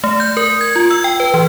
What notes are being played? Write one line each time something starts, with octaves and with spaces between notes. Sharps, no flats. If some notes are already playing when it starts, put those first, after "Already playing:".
A3
G6
A#4
G#6
F4
E6
G5
B4
E3